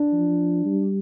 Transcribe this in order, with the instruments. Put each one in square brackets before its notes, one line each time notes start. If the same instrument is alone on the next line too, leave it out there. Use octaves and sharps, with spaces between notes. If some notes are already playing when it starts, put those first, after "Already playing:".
Already playing: [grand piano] D4
[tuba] F3
G3